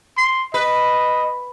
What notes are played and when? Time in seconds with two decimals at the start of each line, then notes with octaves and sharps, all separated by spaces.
0.17 C6
0.54 B4 D#5